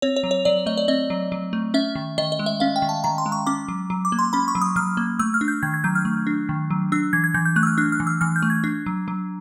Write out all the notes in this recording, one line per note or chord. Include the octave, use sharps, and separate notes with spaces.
C4 C#5
C#5
F#3
C#5
F#3 D5
A3 D#5
D5
C4 D#5
F#3
F#3
A3
C#4 E5
D#3
D#3 D#5
D#5
G#3
E5
C#4 F5
G5
D#3
A5
D#3 A#5
C6
G#3
C#6
C#4 D6
F#3
F#3
D6
A#3
C6
C#4 B5
C#6
F#3
D#6
F#3 F6
A#3
A3 E6
F6
D4
G6
D#3 G#6
G#6
F#3 G6
F6
A3
D4
D#3
F#3
D4 E6
E3 G#6
G#6
E3 G6
G6
A3 F#6
E6
F6
D4 F#6
F6
E3
E6
E3 F6
G6
A3
G#6
D4
F#3
F#3